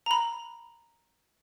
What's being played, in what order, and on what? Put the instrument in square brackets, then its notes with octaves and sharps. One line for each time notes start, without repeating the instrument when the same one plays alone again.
[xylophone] A#5 B5